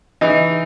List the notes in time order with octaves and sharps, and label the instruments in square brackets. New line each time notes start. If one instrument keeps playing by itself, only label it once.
[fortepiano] E3 D#4